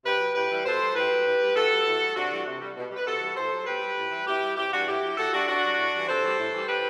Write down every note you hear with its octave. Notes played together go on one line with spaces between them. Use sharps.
C3 G4 B4
F#3
A2 G4 B4
E3 G3
B2 A4 C5
G3
A2 G4 B4
F#3
A2
G3
A2 F#4 A4
G3
A2
E3 G3
C3 D4 F#4
E3 G3
C3
G3
B2
G3
B4
C3 F#4 A4
E3 G3
A2 A4 C5
F#3
B2 G4 B4
G3
A2
E3 G3
B2 E4 G4
G3
C3 E4 G4
E3 G3 D4 F#4
A2 E4 G4
F#3
A2 F#4 A4
G3 D4 F#4
C3 D4 F#4
F#3
A2
E3 G3
C3 A4 C5
E3 G3
A2
E3 G3
C3 G4 B4